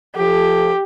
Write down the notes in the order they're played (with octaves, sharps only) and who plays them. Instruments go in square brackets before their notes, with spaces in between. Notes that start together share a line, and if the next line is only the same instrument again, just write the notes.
[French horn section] F3 A4 [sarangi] G4